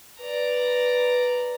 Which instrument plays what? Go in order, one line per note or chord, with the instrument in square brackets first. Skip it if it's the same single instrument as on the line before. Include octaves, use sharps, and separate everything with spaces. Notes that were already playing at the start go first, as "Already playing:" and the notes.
[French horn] B4 [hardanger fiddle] D5 A#5